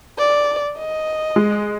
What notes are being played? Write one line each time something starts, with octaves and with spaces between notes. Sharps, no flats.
D5
D#5
G#3